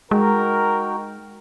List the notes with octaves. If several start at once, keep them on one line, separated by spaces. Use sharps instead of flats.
G#3 D#4 F#4 A#4 G5